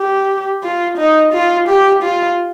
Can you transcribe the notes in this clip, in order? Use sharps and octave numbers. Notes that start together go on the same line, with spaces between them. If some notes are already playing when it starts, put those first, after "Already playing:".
Already playing: G4
F4
D#4
F4
G4
F4